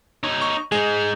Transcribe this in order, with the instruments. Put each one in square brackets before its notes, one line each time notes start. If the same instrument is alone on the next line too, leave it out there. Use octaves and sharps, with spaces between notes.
[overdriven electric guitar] D#4 C#5
[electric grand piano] C#6
[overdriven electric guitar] G#3 D#4 [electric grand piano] G#4